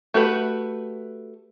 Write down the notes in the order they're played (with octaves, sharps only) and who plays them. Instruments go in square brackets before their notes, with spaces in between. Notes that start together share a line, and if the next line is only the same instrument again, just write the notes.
[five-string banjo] A3 F#4 G4 B4